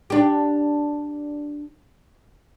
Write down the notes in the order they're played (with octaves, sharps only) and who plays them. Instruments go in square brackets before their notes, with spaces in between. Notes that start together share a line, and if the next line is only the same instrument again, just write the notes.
[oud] D4 G4